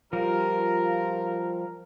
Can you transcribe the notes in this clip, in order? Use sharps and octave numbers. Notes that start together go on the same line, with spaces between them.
F3 G3 F4 A#4